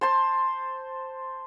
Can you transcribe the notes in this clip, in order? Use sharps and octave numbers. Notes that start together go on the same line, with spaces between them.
C5 A5 C6